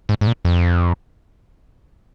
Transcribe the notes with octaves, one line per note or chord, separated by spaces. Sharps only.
G#2
G#2
A#2
F2